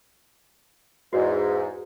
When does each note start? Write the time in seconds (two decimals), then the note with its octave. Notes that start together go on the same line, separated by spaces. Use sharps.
1.13 E2 G#2 F#4